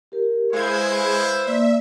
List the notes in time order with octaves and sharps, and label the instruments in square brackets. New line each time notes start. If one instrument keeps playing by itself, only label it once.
[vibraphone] G4 A#4
[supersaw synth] G#3 G#6 [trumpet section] E4 B4 C5 [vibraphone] F5
[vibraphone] A#3 D5 [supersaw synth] E5